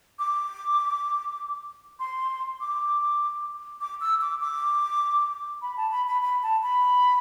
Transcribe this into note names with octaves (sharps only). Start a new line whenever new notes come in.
D6
C6
D6
D6
E6
D6
D6
B5
A5
B5
B5
B5
A5
B5